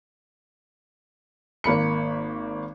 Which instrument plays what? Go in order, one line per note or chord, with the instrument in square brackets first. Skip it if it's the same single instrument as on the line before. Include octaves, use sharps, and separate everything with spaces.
[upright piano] G#1 A#3 B5 C#7